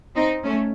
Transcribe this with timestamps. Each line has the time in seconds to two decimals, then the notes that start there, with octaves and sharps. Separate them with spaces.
0.16 C4 D#4
0.44 A3 C#4